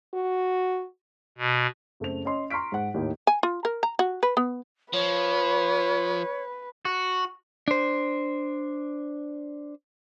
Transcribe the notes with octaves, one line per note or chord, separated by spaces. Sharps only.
F#4
B2
F#1 A3 C4 F7
C#4 D#5 C6
A#5 C6 C#6 F6 B6 D7
G#2 F#5
D#2 A2 A#3 D#4
G#5
F4
A#4
A#5
F#4
B4
B3
F3 B4 C#5
F#4
D4 C5